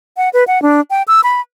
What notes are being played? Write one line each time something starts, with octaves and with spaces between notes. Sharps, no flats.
F#5
B4
F#5
D4
G5
E6
B5